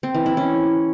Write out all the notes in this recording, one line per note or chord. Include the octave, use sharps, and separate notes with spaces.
C4
E3
E4
C#4